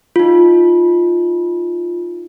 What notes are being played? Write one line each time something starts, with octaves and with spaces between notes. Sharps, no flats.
D#4 F4